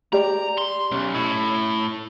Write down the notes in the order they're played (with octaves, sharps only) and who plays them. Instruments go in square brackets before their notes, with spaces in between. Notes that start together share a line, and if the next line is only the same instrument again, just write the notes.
[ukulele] G4 D5 [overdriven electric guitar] A#5
[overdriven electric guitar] C6
[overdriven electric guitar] B1 [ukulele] C#4
[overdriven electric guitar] A2